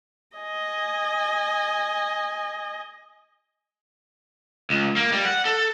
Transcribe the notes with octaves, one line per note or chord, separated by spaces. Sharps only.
D#5 G#5
C#2
A#3
G3
F#5
A4